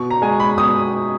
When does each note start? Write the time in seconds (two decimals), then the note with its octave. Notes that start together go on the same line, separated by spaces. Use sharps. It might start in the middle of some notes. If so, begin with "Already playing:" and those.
Already playing: B2 C#6
0.10 A#5
0.22 G#3 G#5
0.40 B5
0.57 B2 D#6